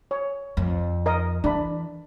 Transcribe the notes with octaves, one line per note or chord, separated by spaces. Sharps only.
C#5
F2
A#4 D#5
E3 D4 B5